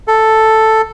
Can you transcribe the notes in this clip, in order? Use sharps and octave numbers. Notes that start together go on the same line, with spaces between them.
A4